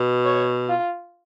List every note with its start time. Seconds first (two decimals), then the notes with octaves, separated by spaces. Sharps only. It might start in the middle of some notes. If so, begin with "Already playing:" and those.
Already playing: B2
0.25 C#5
0.69 F4